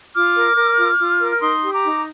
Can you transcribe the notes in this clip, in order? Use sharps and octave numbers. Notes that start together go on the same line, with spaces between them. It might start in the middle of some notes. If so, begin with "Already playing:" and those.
F4 D6 F6
A#4
A#4
F4
F4
A#4
F6
D#4 C6 D#6
G4
A#5 D6
D#4